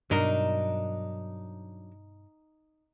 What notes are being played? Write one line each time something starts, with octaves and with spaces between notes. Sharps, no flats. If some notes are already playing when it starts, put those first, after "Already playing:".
G2 B2 F#3 D4 D#4 A#4